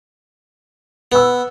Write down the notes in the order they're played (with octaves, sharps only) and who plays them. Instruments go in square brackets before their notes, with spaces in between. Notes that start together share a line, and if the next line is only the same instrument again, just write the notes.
[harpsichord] B3 [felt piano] B4 E6